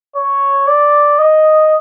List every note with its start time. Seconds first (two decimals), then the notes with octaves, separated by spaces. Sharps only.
0.16 C#5
0.67 D5
1.19 D#5